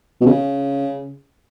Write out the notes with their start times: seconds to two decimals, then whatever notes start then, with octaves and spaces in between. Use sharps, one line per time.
0.21 B2
0.26 C#3